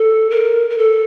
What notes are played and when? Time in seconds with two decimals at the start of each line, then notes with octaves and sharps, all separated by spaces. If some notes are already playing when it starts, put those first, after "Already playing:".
Already playing: A4
0.30 A#4
0.70 A#4
0.78 A4